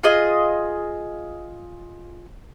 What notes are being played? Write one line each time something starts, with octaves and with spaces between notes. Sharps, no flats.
F4 G#4 D#5